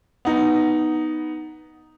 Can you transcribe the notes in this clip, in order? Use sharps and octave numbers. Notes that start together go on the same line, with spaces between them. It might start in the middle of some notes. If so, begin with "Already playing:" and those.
B3 D#4